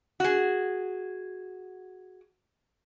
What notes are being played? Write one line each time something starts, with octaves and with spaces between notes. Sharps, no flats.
F#4 G#4